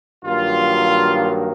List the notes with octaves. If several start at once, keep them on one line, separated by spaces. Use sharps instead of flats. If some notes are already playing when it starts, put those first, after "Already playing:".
G2 D#3 F#3 A#3 F4